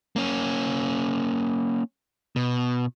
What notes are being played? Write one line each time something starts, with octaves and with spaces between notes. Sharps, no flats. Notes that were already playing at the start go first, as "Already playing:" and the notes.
A#3 C#4
B2